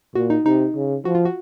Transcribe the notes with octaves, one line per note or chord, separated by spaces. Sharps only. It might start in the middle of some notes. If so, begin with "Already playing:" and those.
A#2 F#4
D#4
C3 D#4
C#3
F3 F#4
F4
F#4